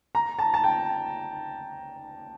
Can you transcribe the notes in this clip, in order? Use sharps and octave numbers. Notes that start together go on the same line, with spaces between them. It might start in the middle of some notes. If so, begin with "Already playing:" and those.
A#5
A5
A5
G5